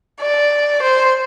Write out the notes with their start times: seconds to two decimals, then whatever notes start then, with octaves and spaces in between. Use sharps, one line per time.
0.21 D5
0.82 C5